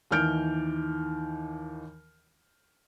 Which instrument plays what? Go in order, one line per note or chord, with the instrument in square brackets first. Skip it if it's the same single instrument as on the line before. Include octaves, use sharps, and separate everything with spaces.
[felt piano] D#2 D#3 E3 F6 G6 D7